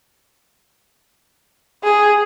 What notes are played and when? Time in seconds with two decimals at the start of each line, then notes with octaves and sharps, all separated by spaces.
1.84 G#4